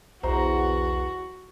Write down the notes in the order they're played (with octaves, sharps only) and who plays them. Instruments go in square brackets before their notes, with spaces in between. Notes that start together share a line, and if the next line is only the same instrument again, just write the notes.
[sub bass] B1 [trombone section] E2 [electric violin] F#4 [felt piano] C5 A#5